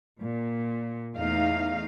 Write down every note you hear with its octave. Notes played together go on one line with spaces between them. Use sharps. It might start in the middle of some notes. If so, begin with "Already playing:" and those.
A#2
E2 A3 D#4 F5